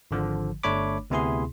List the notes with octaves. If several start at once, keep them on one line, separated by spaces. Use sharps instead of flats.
G#1 D3 F3
G1 A3 D4 C#5 B5 D6
D2 C3 B3 E4 G#4 C6